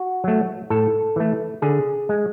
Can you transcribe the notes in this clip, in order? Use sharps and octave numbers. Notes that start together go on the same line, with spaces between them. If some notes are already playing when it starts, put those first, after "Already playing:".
Already playing: F#4
F#3 A3
A2 A4
E3 A3
D3 G#4
G#3